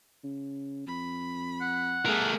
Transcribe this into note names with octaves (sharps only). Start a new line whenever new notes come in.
C#3
F2 B5
F#5
A3 G#4 A#4